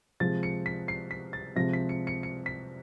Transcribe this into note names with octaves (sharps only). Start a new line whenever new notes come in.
C3 F3 G#3 A6
C#7
B6
C7
B6
A6
C3 F3 G#3 A#6
B6
C#7
C#7
C#7
B6